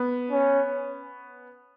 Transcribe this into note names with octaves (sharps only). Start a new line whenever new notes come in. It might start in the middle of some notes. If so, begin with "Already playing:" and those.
Already playing: B3
C#4